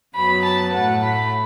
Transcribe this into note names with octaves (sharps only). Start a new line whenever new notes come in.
F#2 F#3 B3 B5
A5
A2 A3 F#5
B5